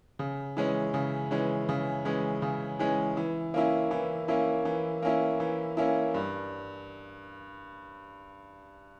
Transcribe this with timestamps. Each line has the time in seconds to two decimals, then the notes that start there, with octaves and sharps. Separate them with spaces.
0.19 C#3
0.57 E3 G#3 C#4
0.94 C#3
1.31 E3 G#3 C#4
1.69 C#3
2.05 E3 G#3 C#4
2.42 C#3
2.79 E3 G#3 C#4
3.17 E3
3.54 A#3 C#4 E4
3.91 E3
4.28 A#3 C#4 E4
4.65 E3
5.02 A#3 C#4 E4
5.40 E3
5.77 A#3 C#4 E4
6.14 G2